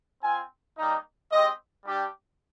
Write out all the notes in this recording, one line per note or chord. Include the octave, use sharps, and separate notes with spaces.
C4 F4 G#5
G3 A#3 D#4
G#3 C4 G4 D#5
G3 D4 G4